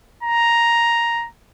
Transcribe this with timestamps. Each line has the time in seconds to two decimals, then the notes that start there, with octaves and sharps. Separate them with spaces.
0.23 A#5